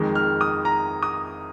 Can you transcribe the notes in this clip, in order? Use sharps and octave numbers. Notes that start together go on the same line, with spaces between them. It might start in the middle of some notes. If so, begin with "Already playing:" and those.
Already playing: F2 D#3 G#3
F6
D#6
A#5
D#6